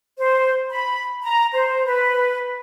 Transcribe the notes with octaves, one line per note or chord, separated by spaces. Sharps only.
C5
B5
A#5
C5
B4